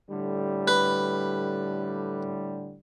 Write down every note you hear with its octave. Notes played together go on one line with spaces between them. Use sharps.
A2 D3 G3
B4